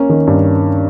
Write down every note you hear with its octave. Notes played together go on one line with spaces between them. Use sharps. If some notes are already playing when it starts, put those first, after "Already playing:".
Already playing: A#3 C#4
D#3
G2